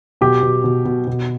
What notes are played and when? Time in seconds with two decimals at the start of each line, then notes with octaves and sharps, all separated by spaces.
0.21 B2 G4
0.43 B2
0.64 B2
0.85 B2
1.07 B2